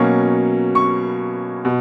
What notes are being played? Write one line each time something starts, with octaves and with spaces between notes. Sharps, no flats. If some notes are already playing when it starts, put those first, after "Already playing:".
Already playing: B2 F#3 A#3 C#4 C#6
C#6
B2